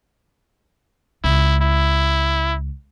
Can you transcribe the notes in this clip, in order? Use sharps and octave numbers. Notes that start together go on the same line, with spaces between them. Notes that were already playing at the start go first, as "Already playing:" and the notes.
C#2 E4
E4